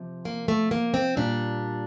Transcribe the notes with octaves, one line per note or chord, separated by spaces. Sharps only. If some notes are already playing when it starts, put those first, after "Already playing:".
Already playing: C3 F3
A#3
A3
A#3
C4
A#2 G3 D4